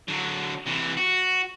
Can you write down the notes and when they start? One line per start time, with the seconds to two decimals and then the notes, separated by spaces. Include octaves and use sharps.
0.08 D3 F#3
0.66 C3 E3
0.97 F#4